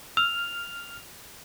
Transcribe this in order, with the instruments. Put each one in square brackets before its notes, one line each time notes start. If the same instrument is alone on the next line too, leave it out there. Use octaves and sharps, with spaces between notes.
[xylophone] E6 [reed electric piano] F6 [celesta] F7